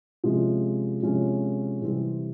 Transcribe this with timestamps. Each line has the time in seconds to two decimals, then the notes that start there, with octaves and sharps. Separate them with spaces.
0.24 C3 F3 G#3 C#4
1.03 C3 F3 G#3 C#4
1.81 C3 E3 G3 C4